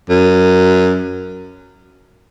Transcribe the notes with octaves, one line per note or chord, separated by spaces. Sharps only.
F#2